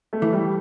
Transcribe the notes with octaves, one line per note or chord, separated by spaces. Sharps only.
A3
E3
G3